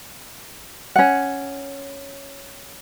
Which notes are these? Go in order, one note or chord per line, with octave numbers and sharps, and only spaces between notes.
C#4 F#5